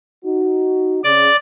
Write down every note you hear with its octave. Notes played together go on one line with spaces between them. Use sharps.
D#4 F#4
C#3 D5